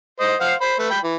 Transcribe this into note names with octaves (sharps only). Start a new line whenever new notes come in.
C5 D#5
C5 F5 F#5
C5 B5
A3 B4
G5 B5
E3